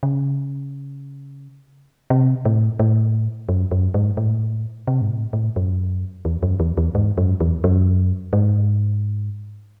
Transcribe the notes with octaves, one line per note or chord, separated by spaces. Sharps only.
C#3
C3
A2
A2
F#2
F#2
G#2
A2
C3
G#2
A2
A2
F#2
E2
F#2
E2
E2
G#2
F#2
E2
F#2
G#2